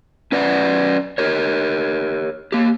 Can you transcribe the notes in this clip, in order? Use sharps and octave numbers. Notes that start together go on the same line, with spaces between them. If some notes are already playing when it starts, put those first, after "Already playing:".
C#4 B4 D5 F#5
G4 A#4 C#5
A#3 G4